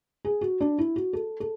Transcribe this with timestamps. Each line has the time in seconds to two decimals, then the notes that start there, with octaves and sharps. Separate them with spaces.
0.25 G#4
0.41 F#4
0.61 D4
0.79 E4
0.96 F#4
1.13 A4
1.40 A4